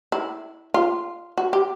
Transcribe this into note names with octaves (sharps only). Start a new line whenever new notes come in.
E4
F4
F#4
G4